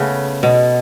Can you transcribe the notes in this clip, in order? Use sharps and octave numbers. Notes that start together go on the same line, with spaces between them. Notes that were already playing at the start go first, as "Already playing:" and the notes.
Already playing: C#3 A3 B3
B2